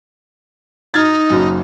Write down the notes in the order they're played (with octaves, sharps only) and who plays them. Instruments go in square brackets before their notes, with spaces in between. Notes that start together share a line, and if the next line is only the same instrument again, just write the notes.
[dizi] D#4 [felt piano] F6 G#6 A6
[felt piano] F#1 F#2